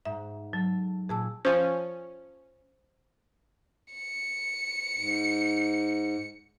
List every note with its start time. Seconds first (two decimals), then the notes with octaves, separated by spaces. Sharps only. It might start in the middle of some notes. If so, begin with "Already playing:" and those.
0.05 G#2 E5
0.53 F#3 A4
1.09 A#2 G#4 A5 E6
1.45 F3 C#4 C5
3.93 C#7
4.98 G#2